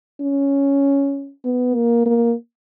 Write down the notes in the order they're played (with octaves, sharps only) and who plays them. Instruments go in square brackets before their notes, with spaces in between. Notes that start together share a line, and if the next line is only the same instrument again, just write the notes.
[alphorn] C#4
B3
A#3
A#3